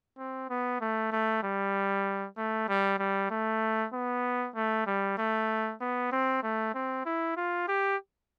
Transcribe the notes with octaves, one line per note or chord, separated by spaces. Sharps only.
C4
B3
A3
A3
G3
A3
G3
G3
A3
B3
A3
G3
A3
B3
C4
A3
C4
E4
F4
G4